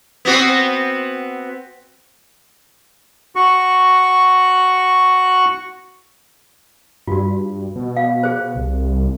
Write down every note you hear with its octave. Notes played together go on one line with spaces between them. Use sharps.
B3 C4 F#4
F#4 C#6
G2 F4 F#4
B2
F5
G#4 C5
C2